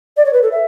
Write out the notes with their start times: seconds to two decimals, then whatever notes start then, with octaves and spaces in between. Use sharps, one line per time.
0.16 D5
0.25 C#5
0.33 B4
0.42 A4
0.51 E5